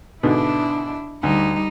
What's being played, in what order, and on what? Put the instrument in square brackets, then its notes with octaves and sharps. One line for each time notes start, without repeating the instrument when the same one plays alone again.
[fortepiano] G#2 B2 D3 [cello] D4 E4
[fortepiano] D2 [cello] G3 D#4